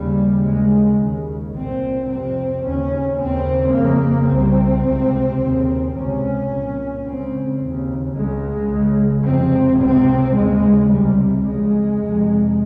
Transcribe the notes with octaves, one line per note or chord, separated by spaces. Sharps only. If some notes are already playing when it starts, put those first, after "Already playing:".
Already playing: D#2 C#3 G3
D#2 C#3 G#3
D#2 C#3
C2 A#2 C4
F2 C3 C4
D#2 C#3 C#4
D#2 C#3 C4
F2 C#3 A#3
C2 C3 C4
C#2 C3
D#2 C#3
C#2 C3 C#4
C2 A#2
C#2 C#3 C4
D#2 C#3
C#2 C#3 G#3
C#2 C#3
F2 C3 C4
C#2 C3 C4
D#2 C#3 G#3
C#2 C3 G3
F2 C#3 G#3
F2 C3